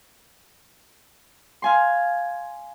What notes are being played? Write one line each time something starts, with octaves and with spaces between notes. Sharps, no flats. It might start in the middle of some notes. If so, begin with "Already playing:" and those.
F5 G#5 C6